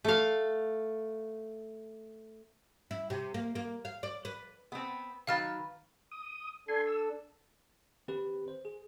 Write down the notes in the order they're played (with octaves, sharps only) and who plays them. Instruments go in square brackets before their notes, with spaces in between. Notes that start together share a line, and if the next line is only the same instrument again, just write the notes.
[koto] A3 F5
[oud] E4
C3
A#3
A#3
F5
D5
B4
[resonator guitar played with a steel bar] B3 C4
[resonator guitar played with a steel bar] D#3 F#3 B4 [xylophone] F5 F6 A6
[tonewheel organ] D#6
[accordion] D4 A4 [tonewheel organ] G#5 C6
[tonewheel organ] E6
[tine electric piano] D#3 C4 G4 B4
C5
G#4